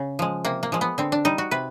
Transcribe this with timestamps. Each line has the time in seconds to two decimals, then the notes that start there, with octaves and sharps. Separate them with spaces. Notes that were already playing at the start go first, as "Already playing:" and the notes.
Already playing: C#3
0.19 F3 G#3
0.45 C3 A#3
0.63 A#3
0.72 F3 G#3
0.81 B3
0.98 D3 C4
1.12 D4
1.25 G3 D#4
1.38 F#4
1.51 C3 B4